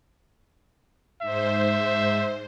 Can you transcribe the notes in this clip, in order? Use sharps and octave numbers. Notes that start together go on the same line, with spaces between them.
G#2 C5 E5